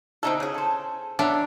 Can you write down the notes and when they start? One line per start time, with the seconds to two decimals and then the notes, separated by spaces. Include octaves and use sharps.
0.23 B2 D3 C4 D#4 E4 A4
0.40 C#3 G#4
0.54 A4 C5
1.19 B3 C#4 D4 A4 E5 A#5